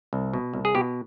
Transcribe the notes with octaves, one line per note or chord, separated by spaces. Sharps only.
C2
B2
C2
G#4
B2 G4